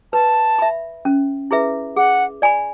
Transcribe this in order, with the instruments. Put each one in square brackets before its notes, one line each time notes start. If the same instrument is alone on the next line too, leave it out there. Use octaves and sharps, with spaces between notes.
[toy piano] B4 [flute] A5
[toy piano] E5 B5
C#4
E4 G#4 B4 E5
[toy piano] G#4 [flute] F#5
[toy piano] D5 G#5 B5